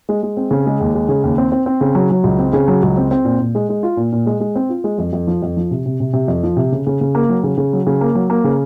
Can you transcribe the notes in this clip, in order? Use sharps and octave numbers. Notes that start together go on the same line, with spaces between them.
G#3
G#3
C4
C#3
G#3
D#2
G#3
C#3
D#2
C4
C4
C4
C#3
F#3
F#3
C#2
C4
C#3
F#3
C#2
C4
C4
A#2
A#2
G#3
G#3
F4
A#2
A#2
G#3
G#3
C4
F4
G#3
F2
F2
F3
F2
F3
C3
C3
C3
C3
F2
F3
C3
C#3
C#3
C#3
A#3
F#3
C#3
C#3
F#3
C#3
A#3
F#3
A#3
C#3